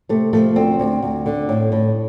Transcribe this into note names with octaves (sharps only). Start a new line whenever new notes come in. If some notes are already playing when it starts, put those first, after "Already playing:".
C3 A3
F3 A3
D2 C4
D2
D2
D3
A2
A2